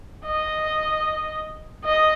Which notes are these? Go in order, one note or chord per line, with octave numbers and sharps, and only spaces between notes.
D#5
D#5